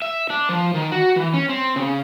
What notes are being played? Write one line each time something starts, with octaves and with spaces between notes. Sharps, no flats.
E5
D4
F3
D#3
F#4
E3
C#4
C4
C#3